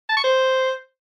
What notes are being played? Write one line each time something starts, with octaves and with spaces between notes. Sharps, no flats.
A5
C#6
C5